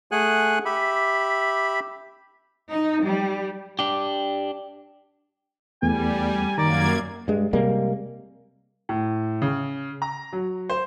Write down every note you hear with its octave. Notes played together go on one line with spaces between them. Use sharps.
A3 G#4 F#5 G#5 F#6
G4 E5 B5
D#4
G3
D4 G4
E2 G3 A3 B3 G#5
F#2 D#3 A#3 D5 A#5 G#6
G2 G#3
C3 G3 G#3 A#3
A2
C#3
A#5
F#3
C5